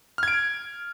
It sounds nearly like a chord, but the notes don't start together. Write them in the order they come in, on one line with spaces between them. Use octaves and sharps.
F6 G#6 D7